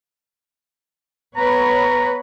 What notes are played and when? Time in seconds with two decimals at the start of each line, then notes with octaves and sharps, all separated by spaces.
1.37 B3 B4 C#5 A#5